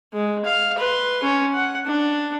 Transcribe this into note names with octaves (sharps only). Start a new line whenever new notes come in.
G#3
F5
B4 C6
C#4
F#5
D4